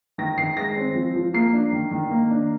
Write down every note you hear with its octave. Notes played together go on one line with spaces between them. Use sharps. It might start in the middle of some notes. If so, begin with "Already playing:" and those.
D#3 A#6
D#3 C7
G#3 A#6
C4
F3
F3
A#3 C7
D4
D#3
D#3
A#3
D4